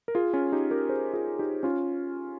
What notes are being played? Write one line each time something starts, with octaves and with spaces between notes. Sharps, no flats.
A#4
F4 G#4
C#4 F4
D#4 G4
G4 A#4
G#4 C5
F4 G#4
D#4 G4
C#4 F4